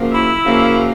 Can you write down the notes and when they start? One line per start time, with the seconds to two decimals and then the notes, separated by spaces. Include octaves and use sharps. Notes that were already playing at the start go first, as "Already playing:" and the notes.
Already playing: F#2 C#3 F3 A#3
0.12 E4 E5
0.44 F#2 C#3 F3 A#3